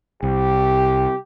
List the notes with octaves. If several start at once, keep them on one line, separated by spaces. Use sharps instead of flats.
C2 G4